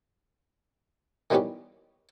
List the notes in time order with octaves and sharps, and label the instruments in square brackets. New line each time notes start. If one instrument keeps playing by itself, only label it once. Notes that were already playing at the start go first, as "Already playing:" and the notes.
[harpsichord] D#3 E3 G3 B3 C#4 G4